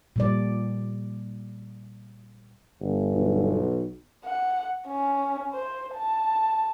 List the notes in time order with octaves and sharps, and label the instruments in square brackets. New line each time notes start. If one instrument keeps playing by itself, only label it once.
[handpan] A#2 G3 D5
[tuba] G1
[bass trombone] B1
[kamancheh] F#5
C#4
C5
A5